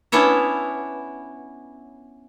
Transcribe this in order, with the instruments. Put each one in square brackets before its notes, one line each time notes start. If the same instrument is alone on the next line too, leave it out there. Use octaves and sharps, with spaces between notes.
[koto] B3 C#4 D4 E4 C#5 E5